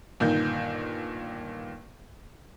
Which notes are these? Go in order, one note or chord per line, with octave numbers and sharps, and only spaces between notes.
G1 A#2 D#3 G6